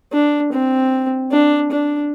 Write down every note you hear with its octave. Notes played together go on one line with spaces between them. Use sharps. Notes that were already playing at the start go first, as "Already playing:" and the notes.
D4
C4
D4
D4